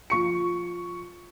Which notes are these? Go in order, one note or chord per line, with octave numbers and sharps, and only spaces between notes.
F3 C#6 C#7